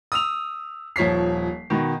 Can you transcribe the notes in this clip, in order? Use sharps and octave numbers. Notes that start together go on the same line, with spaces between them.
D#6 E6 F7
D#1 F3 C#5 B6 C7
B2 D#3